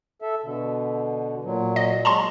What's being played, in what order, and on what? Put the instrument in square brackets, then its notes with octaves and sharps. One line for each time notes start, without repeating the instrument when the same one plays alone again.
[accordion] A4 E5
B2 D3
A#2 F#3
[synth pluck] D#5
[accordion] F#3 G#3 [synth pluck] A5 A#5 C6